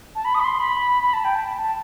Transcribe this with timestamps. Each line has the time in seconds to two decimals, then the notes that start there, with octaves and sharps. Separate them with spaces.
0.15 A5
0.25 B5
0.35 D#6
0.40 B5
0.44 C6
0.59 B5
1.04 B5
1.13 A5
1.24 G5
1.35 A5
1.62 A5